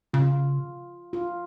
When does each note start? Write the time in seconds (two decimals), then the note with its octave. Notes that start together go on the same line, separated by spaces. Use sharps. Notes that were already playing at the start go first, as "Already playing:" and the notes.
0.13 C#3 F4
1.13 F4